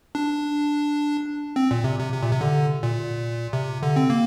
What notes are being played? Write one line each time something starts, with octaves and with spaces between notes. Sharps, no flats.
D4
C4
A#2
C3
C3
C3
A#2
C3
D3
A#2
C3
D3
C4
A#3